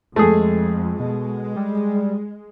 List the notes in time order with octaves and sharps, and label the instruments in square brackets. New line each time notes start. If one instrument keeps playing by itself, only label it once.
[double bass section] F2 [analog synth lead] G#3 [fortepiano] A3 G#4
[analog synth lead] B2 [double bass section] G#3
[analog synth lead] G3